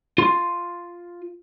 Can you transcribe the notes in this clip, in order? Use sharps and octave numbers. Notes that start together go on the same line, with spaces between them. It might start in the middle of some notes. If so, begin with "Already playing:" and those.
F4 C6